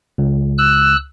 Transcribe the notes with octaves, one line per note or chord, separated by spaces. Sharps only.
C#2
E6 F#6